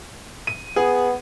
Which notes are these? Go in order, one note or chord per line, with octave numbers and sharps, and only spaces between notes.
D#7
B3 G#4